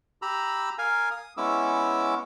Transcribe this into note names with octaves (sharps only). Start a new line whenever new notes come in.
G4 A#5 B5 E6
A#4 F5 G#5
D#6
G#3 B3 C#4 E4 D6 E6